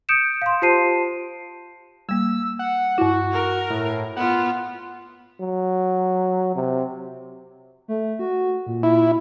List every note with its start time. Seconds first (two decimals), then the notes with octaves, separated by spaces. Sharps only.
0.09 D#6 G6 C#7 D7 E7
0.42 F5 C6
0.62 F4 G4 C5 A5 C7 D#7
2.09 G3 A#3 E6
2.59 F#5
2.98 G2 E4 F#4
3.32 A#4
3.70 A2
4.17 B3 F4 F#5
5.41 F#3
6.55 C3
7.88 A3
8.19 F#4
8.67 A#2
8.83 E4